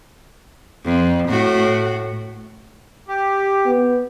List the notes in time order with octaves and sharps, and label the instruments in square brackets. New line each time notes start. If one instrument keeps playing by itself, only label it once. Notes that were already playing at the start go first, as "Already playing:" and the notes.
[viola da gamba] F2
A2 F#4
[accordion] G4
[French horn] B3